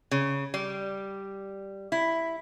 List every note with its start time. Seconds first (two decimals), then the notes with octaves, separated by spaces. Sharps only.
0.11 C#3
0.54 G3
1.92 E4